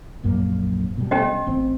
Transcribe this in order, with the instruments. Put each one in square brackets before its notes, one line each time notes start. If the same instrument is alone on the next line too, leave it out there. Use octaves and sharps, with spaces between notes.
[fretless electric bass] A#1 F#2 A#3
B2 G3
[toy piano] C#4 G4 D#5
[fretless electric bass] A1 C4